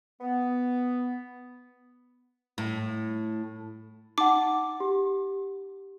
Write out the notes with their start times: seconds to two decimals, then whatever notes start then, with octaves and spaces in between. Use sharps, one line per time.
0.21 B3
2.58 A2
4.18 D#4 F#5 D6
4.80 G4